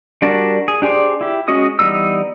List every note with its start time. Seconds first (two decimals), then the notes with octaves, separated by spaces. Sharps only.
0.22 G3 D4 F#4 A#4 A5
0.68 G#4
0.82 D4 G4 G#4 C5 D5
1.21 E4 G4
1.48 G#3 C#4 F#4 D#5 D#6
1.79 E3 G3 B3 D#4 E6